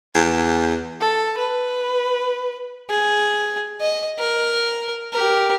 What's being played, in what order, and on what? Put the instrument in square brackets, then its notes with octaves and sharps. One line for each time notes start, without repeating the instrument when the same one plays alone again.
[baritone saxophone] E2
[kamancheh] A4
B4
[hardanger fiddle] G#4
D#5
A#4
G4 A#4